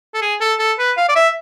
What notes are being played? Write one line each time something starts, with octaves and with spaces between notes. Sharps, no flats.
A4
G#4
A4
A4
B4
F5
D5
E5